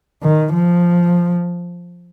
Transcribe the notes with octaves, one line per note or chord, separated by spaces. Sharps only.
D#3
F3